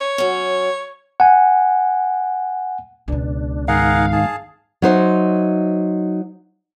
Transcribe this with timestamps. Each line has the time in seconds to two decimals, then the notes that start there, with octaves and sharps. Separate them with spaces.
0.01 C#5
0.18 F#3 C#4
1.20 F#5 G#5
3.08 C#2 B2 D4
3.68 G#2 D#3 G#4 A#4 F5 F#5
4.13 G#4 A5
4.82 F#3 D#4 C5 E5